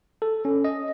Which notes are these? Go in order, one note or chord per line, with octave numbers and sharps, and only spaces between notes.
A4
C#4
D#5